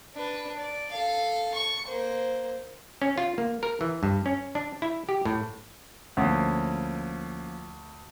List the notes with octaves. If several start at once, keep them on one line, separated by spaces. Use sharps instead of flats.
D4 B4
D5
A4 F5
C#6
A#3 C5
C#4
F4
A#3
A#4
E3
G2
C#4
D4
E4
G4
A2
D2 F3 A#3 C#4